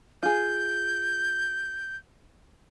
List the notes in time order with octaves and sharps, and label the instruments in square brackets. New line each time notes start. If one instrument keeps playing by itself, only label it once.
[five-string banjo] F4 G#4 [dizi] G6